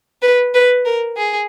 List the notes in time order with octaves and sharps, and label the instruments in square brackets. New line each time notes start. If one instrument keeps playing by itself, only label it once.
[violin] B4
B4
A#4
G#4